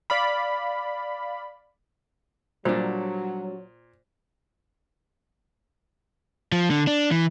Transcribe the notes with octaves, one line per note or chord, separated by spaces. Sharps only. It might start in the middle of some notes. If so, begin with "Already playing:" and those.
D5 F5 B5
A#2 F#3 G3 D4 C5
F3
D3
D4
E3